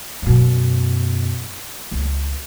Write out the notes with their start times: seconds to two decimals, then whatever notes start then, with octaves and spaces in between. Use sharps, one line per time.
0.22 F#2 B2
1.91 C#2